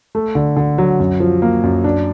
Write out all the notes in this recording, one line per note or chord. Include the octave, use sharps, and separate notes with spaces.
A3
D3
D3
F#3
F#2
F3
A#3
F#2
D4